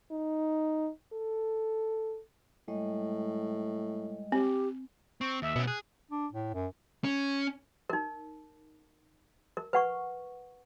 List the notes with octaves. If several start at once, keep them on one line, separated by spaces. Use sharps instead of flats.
D#4
A4
A2 G3 G#3 D#5
C4 G4
C4 C#6
D#2 E5
B2 B3 C#4
G#4 F#6
D4
A2
F#2
C#4
D#4 A#4
A#4
B4 F#5 C#6